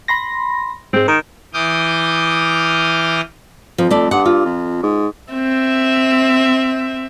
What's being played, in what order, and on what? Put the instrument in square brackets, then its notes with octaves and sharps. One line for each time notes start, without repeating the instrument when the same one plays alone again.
[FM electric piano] B5 C6 A#6
[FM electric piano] G#2 G#3 [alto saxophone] C4
[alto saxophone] D#3 [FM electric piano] A#4
[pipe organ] E3 D6 D#6 F6 G6
[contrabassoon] F2 [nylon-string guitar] F3
[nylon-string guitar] A3 D5
[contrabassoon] G2 [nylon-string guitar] F#5
[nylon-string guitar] F4
[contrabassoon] F2
G#2
[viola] C4 E5